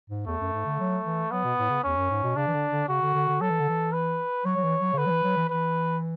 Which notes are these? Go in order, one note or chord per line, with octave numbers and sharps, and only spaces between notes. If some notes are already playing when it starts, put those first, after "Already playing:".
G#2
E2 A3
F#2
G#2
D3
F#3
E3
F#3 B3
B2
A2
C#3
E2 C#4
F#2
G#2
B2
C#3 D4
E3
D3
D3
C#3 F#4
D3
D3
D3
F#3 A4
E3
D3
E3
B4
F#3 C#5
F#3
E3
F#3
C#3
D3 B4
F#3
E3
F#3
E3
E3 B4